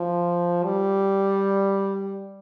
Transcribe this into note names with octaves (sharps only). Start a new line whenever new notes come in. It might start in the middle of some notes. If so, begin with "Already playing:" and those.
Already playing: F3
G3